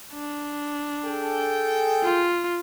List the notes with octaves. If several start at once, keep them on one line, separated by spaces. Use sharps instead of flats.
D4
G#4 A4 G5
F4